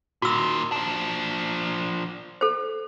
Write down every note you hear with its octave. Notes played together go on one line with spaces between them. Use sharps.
A#2 D#3 F#4 E6
F3 D4
A4 C5